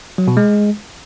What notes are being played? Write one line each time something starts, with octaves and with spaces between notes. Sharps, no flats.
F#3
B2
G#3